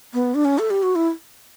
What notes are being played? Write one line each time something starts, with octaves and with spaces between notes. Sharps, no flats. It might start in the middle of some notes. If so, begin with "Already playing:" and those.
B3
D4
C#4
A4
G4
F#4
E4